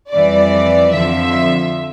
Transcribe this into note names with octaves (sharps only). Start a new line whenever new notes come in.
F2 E3 G3 D5
F2 D3 F3 E5